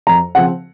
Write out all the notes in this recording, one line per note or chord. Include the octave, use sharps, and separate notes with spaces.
F2 A#5
C#3 F3 C4 F#5